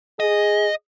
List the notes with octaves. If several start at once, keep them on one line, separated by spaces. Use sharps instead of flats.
G#4 D#5